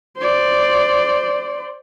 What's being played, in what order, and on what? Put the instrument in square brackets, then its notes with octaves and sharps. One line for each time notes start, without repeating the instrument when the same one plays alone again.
[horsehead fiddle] C5 D5